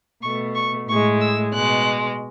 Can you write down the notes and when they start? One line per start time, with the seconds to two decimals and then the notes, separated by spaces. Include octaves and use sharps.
0.22 B2 A3 C#6
0.55 C#6
0.88 A2 G#3 C#6
1.20 E6
1.54 B2 G#3 F#6